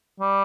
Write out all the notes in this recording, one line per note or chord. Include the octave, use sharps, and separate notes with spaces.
G3